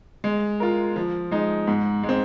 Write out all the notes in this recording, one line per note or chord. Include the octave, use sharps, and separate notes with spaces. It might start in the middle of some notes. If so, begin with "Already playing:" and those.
G#3
F4 A#4
F3
G#3 D#4
G#2
G#3
C4